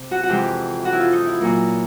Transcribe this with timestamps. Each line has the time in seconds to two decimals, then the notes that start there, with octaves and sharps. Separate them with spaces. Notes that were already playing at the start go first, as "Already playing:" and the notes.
Already playing: C3
0.11 F#4
0.23 F#4
0.29 F2 C3 E3 G#3 G4
0.85 F#4
0.93 E4
0.99 F4
1.13 D#4
1.26 E4
1.40 A#2 F#3 A#3